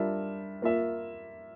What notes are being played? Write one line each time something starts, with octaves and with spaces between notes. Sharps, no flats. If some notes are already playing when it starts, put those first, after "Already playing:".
Already playing: G3 D4 F4 A#4 E5
A#3 F4 A#4 E5